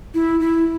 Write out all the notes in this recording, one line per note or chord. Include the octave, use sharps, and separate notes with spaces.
E4
E4